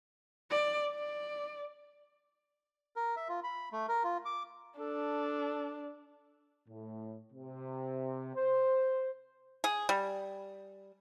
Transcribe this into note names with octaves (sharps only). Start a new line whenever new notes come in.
D5
D5
A#4
E5
F4
B5
A3
A#4
F4
D6
D4 A4
A2
C3
C5
G#4
G3